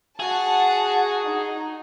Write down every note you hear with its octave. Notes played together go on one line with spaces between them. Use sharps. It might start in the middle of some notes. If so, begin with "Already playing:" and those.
F#4 G#4 F#5 A5
D#4